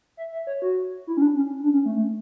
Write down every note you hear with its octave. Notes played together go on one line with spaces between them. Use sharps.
E5
E5
C#5
F#4
E4
C#4
D4
C#4
D4
C#4
A3
A3